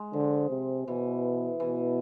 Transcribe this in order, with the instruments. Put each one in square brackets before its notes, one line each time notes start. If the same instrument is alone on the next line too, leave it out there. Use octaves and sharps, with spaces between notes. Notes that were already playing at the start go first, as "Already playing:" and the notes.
Already playing: [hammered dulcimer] G#3
[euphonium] D3 [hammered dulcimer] F3
[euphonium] C3
[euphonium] B2 [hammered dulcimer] E3
[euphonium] B2 [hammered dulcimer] E3